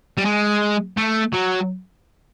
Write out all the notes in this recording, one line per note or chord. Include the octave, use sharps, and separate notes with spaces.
G3
G#3
A3
F#3